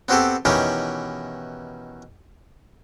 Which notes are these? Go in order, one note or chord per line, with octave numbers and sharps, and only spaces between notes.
B3 C4 F#4 G4 A4
B2 D#3 E3 C#4 D#4 G4